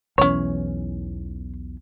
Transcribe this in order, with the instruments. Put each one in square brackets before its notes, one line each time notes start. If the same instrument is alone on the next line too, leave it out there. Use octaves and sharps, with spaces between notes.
[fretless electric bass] B1 E2 E3 [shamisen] C#4 C#5